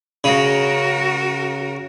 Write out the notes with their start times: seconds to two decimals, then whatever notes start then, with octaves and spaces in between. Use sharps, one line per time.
0.24 C#3 F#4 A#4